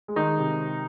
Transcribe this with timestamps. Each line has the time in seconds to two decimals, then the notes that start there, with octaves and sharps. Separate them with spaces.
0.08 G#3
0.16 D#3 D#4
0.39 C3